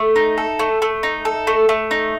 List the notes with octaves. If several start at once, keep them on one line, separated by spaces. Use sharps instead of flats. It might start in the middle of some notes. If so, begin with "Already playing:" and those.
Already playing: A3
D#4
A4
A3
A3
D#4
A4
A3
A3
D#4